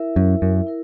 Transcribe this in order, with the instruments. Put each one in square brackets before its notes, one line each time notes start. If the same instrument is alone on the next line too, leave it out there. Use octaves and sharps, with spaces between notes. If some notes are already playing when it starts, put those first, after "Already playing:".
Already playing: [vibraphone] E4 A#4 E5
[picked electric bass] F#2
F#2
[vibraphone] E4 A#4